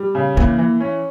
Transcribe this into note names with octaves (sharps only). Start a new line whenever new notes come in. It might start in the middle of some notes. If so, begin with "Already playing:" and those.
Already playing: G3
C#3
E3 A#3
E3
C#4